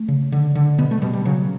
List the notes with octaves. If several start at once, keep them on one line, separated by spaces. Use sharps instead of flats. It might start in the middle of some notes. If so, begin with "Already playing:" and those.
Already playing: A3
C#3
D3
D3
B2 B3
A3
B2 G3
G3
C#3 F#3